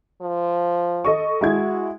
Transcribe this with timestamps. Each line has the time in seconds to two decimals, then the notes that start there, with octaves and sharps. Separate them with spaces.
0.22 F3
1.04 A4 D#5 C#6
1.41 G#3 E4 F#4 G#6